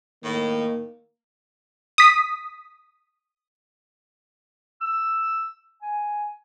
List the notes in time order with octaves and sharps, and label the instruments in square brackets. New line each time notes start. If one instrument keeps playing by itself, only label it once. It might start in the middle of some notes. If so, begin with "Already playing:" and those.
[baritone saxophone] A2 [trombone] D#3 [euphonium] A#3
[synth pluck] D#6 B6
[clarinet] E6
G#5